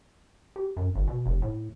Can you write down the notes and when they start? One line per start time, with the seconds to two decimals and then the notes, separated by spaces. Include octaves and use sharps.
0.56 G4
0.77 F#2
0.95 G1
1.08 B2
1.26 F1
1.42 A2